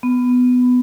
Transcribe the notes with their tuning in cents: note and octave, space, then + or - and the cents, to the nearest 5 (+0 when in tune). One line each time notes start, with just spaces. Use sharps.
B3 +15